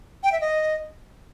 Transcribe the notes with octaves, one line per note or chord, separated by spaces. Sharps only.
G5
E5
D#5